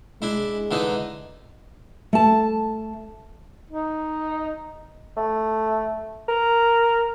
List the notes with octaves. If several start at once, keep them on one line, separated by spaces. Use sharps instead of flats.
G#3 D4 E4
D3 E3 D#4
A3 A5
D#4
A3
A#4